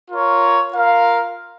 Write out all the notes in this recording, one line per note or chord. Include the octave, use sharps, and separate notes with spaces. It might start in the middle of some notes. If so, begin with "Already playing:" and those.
F4 A#4 C#5
F4 A#4 F5